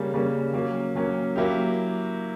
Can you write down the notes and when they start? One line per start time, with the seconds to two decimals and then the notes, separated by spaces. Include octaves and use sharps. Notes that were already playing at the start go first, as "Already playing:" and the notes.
Already playing: C#3 G3 A#3 C#4
0.14 C#3 G3 A#3 C#4
0.53 F#3 A#3 C#4
0.96 F#3 A#3 C#4
1.36 F#3 A#3 E4 G4